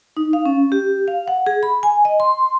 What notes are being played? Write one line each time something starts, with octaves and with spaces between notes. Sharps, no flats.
D#4
F5
C#4
G4
F5
F#5
G#4
B5
G#5
D#5
C6